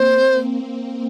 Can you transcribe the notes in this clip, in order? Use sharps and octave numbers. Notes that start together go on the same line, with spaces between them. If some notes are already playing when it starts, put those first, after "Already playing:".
Already playing: A#3 C4 C5
A#3 C4